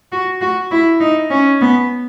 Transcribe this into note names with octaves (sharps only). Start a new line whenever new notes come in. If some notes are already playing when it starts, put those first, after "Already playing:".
F#4
F#4
E4
D#4
C#4
B3